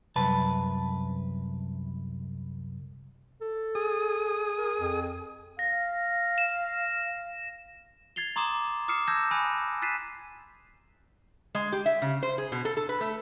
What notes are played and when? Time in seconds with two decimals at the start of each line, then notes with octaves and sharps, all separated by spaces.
0.16 C2 F#2 B4 A5
3.41 A4
3.75 G#4 D#6
4.58 A#4
4.80 F2
5.59 F5 A#6
6.38 E7
8.16 G#6 A6 C7 F7 G7
8.36 A#5 C6 D6 D#6 G#6 E7
8.88 D6 D#6 F6 C7 C#7 E7
9.07 A5 E6 G6 G#6 A#6 E7
9.31 G#5 B5 D#6 F#6 C#7
9.82 F#6 A6 B6 C7 D#7 E7
11.55 G#3
11.72 G4
11.86 E5
12.02 C#3
12.23 C5
12.38 G#4
12.52 B2
12.65 A4
12.77 A4
12.89 B4
13.01 A3